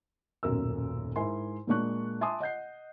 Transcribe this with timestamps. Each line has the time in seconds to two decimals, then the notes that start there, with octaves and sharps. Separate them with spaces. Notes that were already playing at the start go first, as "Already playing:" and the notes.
0.43 D#1 B1 F#2 A#4 E6
1.16 G#2 E4 A#4 G#5 C6
1.67 A#2 G#3 A#3 D4 C#6 F#6
2.21 E5 G#5 A5 C6 D6 D#6
2.40 D#5 F#5 G6 C7